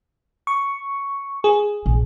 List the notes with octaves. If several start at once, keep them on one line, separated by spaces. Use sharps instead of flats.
C#6
G#4
A#1